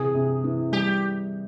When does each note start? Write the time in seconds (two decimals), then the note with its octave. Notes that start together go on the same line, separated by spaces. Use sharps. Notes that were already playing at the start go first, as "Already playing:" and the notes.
Already playing: C3 E3 G#4
0.14 C3
0.44 E3
0.72 G3 G4